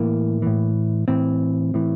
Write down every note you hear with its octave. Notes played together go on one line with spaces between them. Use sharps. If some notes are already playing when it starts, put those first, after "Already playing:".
Already playing: A2 E3 A#3
A2 E3
A2 E3 C4
A2 E3